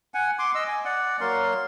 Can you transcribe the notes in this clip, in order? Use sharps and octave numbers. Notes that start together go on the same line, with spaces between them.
F#5 G#5
C6 D6
D#5 E6
G#5
D5 F#5
F#3 A#3 A#4 C6